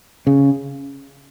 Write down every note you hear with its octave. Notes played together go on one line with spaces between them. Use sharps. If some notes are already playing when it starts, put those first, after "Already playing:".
C#3